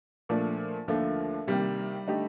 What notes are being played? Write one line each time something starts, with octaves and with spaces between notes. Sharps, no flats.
A#2 F3 A3 D4
D#2 D3 F3 A3 A#3 F4
C3 D#3 G3 A#3
D3 A3 D#4 G4